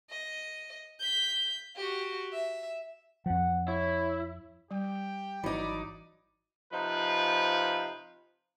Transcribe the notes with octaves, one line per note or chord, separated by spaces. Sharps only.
D#5
G6 B6
F#4 G4
E5
F2 F3 F#5
E4 C#5
G3 G4 G5
G#1 E3 F#3 D#4 D5 B5 D6
C3 F3 D#4 F4 B4